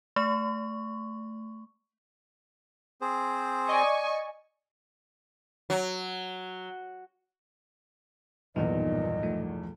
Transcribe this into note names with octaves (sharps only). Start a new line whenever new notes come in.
A3 C#6
C4 G#4 C5
D5 D#5 G#5 C#6
F#3
B1 E2 G2 A#2 D#3 A#3 B3 D#5
F3 A3